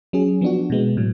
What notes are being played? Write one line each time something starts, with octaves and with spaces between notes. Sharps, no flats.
F#3 C#4 G#4
F3 B3 D4 F#4
B2 G#3 B3
A2 F#3